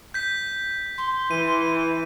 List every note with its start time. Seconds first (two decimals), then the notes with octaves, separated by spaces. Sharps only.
0.14 G6 B6
0.98 C6
1.31 E3 D#7